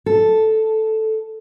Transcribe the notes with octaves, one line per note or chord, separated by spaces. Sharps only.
A4